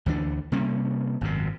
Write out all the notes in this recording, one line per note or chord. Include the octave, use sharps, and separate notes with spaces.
D2 E3 F3 D4
C3 G3 A#3 C#4
G#1 F#2 C3